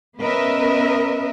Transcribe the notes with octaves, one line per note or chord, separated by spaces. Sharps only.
B3 C#4 A#4 B4 D#5 E5